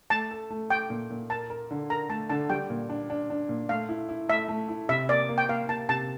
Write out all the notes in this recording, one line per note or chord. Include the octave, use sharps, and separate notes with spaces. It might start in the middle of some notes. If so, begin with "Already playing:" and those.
A3 A5
A4
A3
A3 G5
A#2
A#2
A#4 A5
A#4
D3
A#4 A#5
A3 A5
D3 A5
G3 G5
A#2
D4
D4
D4
A#2
A3 F5
E4
E4
A3 E5
A3
E4
C3 E5
A#3 D5
A#3
G5
A#3 F5
A#3 A5
C3 A5